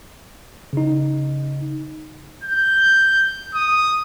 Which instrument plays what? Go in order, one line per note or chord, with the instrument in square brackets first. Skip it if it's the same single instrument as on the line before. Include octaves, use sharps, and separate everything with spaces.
[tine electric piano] C#3 D#4
[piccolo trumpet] G6
D#6